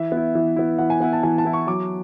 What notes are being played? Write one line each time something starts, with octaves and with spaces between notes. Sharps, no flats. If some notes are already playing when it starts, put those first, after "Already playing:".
Already playing: E3 E5
B3 E4
E3
B3 E4
E3 F#5
G#5
B3 E4 F#5
A5
E3 G#5
A5
B3 E4
C#6
F#3 D6